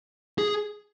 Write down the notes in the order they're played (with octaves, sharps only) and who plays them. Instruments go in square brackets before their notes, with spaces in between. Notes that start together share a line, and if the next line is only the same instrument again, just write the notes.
[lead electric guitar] G#4